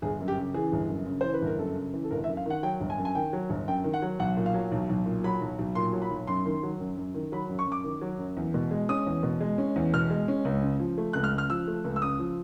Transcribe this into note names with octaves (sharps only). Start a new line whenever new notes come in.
G1 G#4
F#2
G4
C#3
E3 G#4
G1
F#2
C#3
E3 C5
B4
G1 A#4
F#2 A4
C#3
E3
A4
G1 A#4
E5
F#2
F5
D#3 F#5
F#3 G5
G1
G#5
F#2
G#5
D#3 G5
F#3
G1
F#2 G5
D#3
F#5
F#3
B1 F#5
A#2
F5
F#3
B1
B1
A#2
F#3 B5
B1
B1
A#2 C6
F#3
B5
B1
F#2 C6
D#3
F#3
F#2
F#2
D#3
F#3 B5
F#2
C#6
F#2 D6
D#3
F#3
F#2
E2
B2
G#3
C#4 D#6
E2
B2
G#3
C#4
E2
B2 F6
G#3
C#4
C#2
C#3
F3
A3
C#2 F#6
F6
C#3
F6
F3 E6
A3
C#2
E6
C#3 D#6
F3